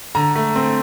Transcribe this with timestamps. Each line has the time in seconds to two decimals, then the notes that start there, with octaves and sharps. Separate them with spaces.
0.15 D3 A#5
0.35 A3
0.56 C4